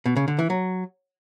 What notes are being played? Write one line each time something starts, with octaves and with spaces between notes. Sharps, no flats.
B2
C#3
D3
E3
F#3